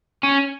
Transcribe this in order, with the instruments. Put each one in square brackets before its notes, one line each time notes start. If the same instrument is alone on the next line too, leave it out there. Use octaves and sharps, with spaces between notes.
[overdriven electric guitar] C#4